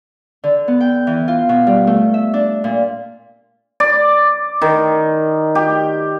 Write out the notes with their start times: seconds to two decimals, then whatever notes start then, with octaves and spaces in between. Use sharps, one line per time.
0.44 D3
0.68 B3
0.81 G5
1.07 E3
1.28 F4
1.49 B2
1.67 G3
1.87 A3
2.14 E5
2.34 D4
2.64 A#2
3.80 D5
4.62 D#3
5.55 G4